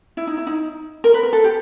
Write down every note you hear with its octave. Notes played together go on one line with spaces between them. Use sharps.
E4
D#4
E4
D#4
A#4
B4
A#4
A4
G4